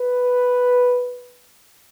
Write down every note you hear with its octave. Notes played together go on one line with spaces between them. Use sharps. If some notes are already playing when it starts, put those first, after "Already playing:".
Already playing: B4